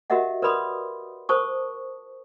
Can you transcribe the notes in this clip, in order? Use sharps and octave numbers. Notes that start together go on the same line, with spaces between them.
F#4 G4 A#4 D#5 E5 F#5
A#4 B4 D5 B5 C6 D#6
A#4 C5 A5 C#6 D#6